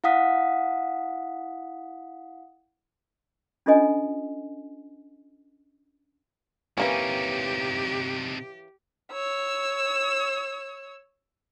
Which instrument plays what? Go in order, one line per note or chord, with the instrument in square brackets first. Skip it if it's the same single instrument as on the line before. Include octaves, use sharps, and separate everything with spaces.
[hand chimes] E4 F5 F#5 D#6 B6
[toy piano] C#4 D4 F4 A4 D#5 G#5
[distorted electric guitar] C3 D#4 [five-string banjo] E3 A#3 C#4 [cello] G4
[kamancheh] C#5 E6